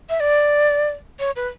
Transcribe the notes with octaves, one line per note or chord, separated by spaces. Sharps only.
E5
D5
C#5
B4